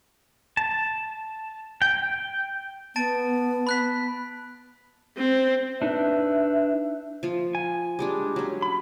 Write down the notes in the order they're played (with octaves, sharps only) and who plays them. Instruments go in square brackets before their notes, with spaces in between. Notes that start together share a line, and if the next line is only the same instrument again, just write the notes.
[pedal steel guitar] A5
G5
[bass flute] B3 [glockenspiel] A5 A6 D7
[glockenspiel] B5 F#6 B6
[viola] C4
[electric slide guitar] D4 D#4 B4 [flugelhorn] E5
[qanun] F3 F4
[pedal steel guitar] G#5
[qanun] G3 G#3 D4
F#3 C#4
[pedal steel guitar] B5